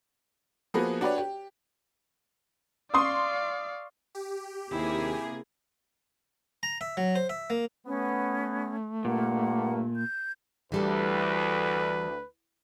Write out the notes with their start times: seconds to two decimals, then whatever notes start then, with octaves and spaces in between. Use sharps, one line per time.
0.74 F3 A#3 B3 F#4 G#4 B4
1.01 D4 F#4 G4 B4 C#5 D5
1.18 G4
2.94 D5 F5 C6 C#6 D#6
4.15 G4
4.71 D#2 C3 A#3 E4 G#4
6.63 A#5
6.81 E5
6.97 F#3
7.15 C5
7.29 E5
7.50 A#3
7.87 A3 B3 C#4
9.05 G2 A#2 A#3 F#5
9.96 G6
10.72 D2 E3 G3 A4 B4